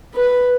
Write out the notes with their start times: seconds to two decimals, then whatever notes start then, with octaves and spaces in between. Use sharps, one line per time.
0.15 B4